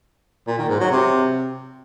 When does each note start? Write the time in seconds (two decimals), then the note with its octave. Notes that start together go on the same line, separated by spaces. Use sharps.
0.47 A#2
0.58 D#3
0.69 G#2
0.80 F#3
0.91 C3